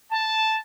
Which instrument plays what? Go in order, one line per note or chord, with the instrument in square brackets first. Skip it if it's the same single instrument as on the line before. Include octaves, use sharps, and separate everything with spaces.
[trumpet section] A5